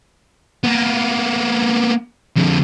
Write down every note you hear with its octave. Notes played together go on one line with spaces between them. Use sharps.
A#3 B3
F2 D3